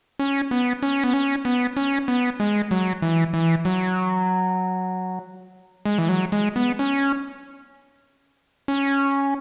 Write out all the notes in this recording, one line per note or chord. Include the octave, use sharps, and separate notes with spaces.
C#4
B3
C#4
B3
C#4
B3
C#4
B3
G#3
F#3
E3
E3
F#3
G#3
E3
F#3
G#3
B3
C#4
C#4